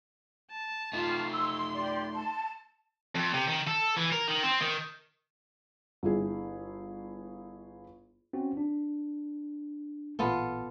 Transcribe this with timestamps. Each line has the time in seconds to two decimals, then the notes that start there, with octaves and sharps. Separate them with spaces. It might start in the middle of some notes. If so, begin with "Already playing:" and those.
0.50 A5
0.93 A3 D#4 F4
1.31 C6 E6
1.76 G4 D5
2.15 A5
3.15 F2
3.34 C3
3.48 D#3
3.67 A4
3.97 E3
4.12 A#4
4.28 D#3
4.43 C4
4.61 D#3
6.03 G1 E4 G#4
8.33 C4 C#4 F#4
8.57 D4
10.19 A1 A#2 B3 F4 A4